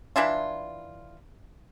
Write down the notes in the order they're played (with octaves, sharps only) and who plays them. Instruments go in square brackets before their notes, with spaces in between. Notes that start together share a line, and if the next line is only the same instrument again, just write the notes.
[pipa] E3 D4 E4 F4